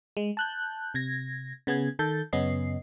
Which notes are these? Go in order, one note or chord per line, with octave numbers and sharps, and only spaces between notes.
G#3
A5 F#6 G6
C3 G#6 A#6
C#3 B3 G#4 G#6
D#3 A4 G6 A6
F#2 C#3 B3 C#4 D#5 C7